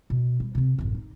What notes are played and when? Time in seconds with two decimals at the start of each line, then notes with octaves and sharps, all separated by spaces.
0.10 B2
0.40 G3
0.55 C3 C4
0.78 A1 F#2
0.95 D#4